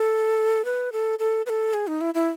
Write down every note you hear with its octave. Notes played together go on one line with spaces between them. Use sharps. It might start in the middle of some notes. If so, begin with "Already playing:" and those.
Already playing: A4
B4
A4
A4
B4
A4
G#4
D#4
E4
E4